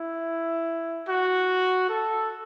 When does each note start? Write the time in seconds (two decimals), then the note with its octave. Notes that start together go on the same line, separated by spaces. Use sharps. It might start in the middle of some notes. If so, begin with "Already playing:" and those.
Already playing: E4
1.08 F#4
1.89 A4